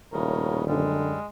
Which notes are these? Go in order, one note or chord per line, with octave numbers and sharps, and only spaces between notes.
D#1 A2 C#3 A#4
F#2 D3 G3 G#3